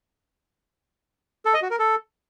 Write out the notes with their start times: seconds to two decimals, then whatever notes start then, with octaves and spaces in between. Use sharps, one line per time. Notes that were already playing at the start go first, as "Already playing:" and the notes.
1.45 A4
1.54 D#5
1.62 F#4
1.71 A#4
1.79 A4